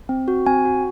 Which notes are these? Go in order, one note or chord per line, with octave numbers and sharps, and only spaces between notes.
C4
F#4
C4 G#5
F#4